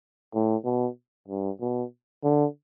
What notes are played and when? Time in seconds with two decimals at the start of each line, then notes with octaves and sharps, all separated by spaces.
0.34 A2
0.65 B2
1.28 G2
1.61 B2
2.23 D3